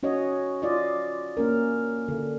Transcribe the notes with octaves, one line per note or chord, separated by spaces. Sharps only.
C#4 F#4 C#5 D#5
F4 D5 D#5
A#3 C#4 A#4
D3